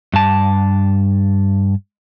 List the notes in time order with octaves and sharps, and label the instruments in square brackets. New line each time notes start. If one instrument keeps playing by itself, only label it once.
[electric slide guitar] G2 A5